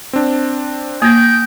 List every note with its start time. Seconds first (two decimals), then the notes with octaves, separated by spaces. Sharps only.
0.13 C4 D4
1.02 A#3 G5 D#6 G#6 A#6